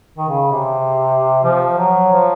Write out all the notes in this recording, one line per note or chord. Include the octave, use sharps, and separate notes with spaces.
D#3
C#3
C3
F3
F#3
F3